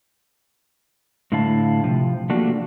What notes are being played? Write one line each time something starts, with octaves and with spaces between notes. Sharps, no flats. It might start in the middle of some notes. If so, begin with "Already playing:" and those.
A2 D3 A3 E4 F5 A5
C3 F3
F3 A3 A#3 D4 F#4 G4